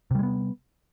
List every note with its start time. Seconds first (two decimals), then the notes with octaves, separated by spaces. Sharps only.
0.11 C3
0.15 G3
0.19 G#3
0.23 B3